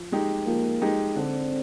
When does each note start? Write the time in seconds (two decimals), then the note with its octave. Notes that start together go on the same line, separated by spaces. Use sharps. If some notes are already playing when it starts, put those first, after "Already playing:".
Already playing: F3
0.12 G#3 D#4 G4
0.46 F3 A#3
0.82 G#3 D#4 G4
1.16 D3 C4